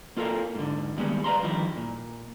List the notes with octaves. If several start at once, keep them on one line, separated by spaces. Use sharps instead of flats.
A#3 F4 A4 A#4 F5
G#2 D3
D#2 G3 G#3 B3
B4 D5 F5 A#5 C6
G2 D#3 F3 D#4 E4
A#2